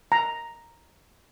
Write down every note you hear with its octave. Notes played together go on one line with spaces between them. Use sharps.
A#5